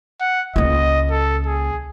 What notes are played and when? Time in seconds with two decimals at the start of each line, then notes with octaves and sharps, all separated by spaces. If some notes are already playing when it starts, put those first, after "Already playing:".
0.20 F#5
0.56 C#2 A#3 D#5
1.11 A4
1.45 G#4